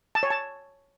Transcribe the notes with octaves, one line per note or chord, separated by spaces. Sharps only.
A5
C#5
A5